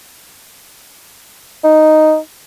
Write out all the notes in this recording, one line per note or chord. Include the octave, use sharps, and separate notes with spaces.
D#4